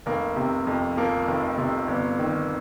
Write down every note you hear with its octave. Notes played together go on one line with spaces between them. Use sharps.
F1 A#3
C3
F2
F3 A#3
F1
C3
G1
D#3